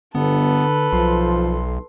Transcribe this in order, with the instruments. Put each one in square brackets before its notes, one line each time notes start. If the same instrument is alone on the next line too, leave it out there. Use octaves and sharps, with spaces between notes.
[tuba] G1 [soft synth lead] D3 [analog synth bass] B3 [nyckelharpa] A4 B4
[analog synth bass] B1 [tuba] F3 [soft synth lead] C6